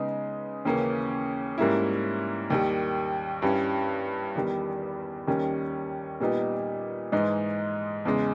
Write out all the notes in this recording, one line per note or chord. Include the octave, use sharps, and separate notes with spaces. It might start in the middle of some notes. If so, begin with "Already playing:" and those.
Already playing: C#3 G#3 B3 D#4
D#2 C#3 E3 A#3 C#4
G#2 G3 A#3 C#4 E4
D#2 D#3 G3
G2 G3 C#4 E4
E2 D#3 G3
D#2 D#3 G3 C#4
A#2 G3 B3 D#4
G#2 E3 G#3 D#4
E2 C#3 G#3